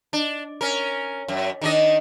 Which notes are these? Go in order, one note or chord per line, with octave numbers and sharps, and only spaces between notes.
D4
C#4 A#4
F#2
D#3 D4 D#5